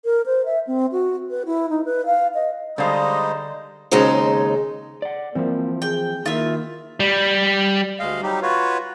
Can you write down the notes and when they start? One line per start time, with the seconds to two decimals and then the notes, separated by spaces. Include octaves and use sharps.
0.05 A#4
0.26 C5
0.45 E5
0.67 C4
0.92 F#4
1.30 B4
1.46 E4
1.69 D#4
1.85 B4
2.06 F5
2.34 D#5
2.78 D3 G3 G#3 D#4 C5 D#5 F5
3.91 D#2 C#3 G#3 C4 D#4 C5
5.02 D5 F#5
5.35 E3 F3 A#3 C4 E4
5.82 G#4 G5
6.26 D#3 A#3 E4 F4 E5
7.00 G3
7.99 D2 G#3 D#5 F5
8.23 F#3 G3 D#4 G4
8.42 F4 F#4 B4 C#5